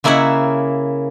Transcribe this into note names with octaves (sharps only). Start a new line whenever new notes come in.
C#3 A#3 E4 C#5 E5 F#5